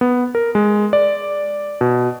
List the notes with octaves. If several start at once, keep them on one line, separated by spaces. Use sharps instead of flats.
B3
A#4
G#3
D5
B2